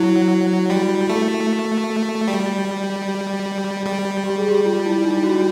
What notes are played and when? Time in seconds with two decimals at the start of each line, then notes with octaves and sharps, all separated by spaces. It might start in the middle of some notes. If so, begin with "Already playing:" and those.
Already playing: F#3 E4
0.70 G3 F#4
1.09 A3
2.28 G3
3.86 G3 G4
4.25 G4
4.38 G#4
4.50 G4
4.65 F4
4.86 E4
5.05 D#4
5.24 F#4